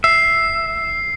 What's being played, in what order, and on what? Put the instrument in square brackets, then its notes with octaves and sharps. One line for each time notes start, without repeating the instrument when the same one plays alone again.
[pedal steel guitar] E5 [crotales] C7